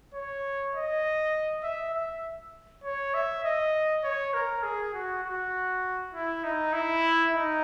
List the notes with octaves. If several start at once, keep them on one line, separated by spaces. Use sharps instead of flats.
C#5
D#5
E5
E5
C#5
E5
D#5
C#5
A#4
G#4
F#4
F#4
E4
D#4
E4
D#4